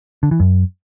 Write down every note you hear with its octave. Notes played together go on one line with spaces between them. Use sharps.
D3
E3
F#2